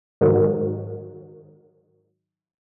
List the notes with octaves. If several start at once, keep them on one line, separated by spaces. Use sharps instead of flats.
G#2 D#3 F#3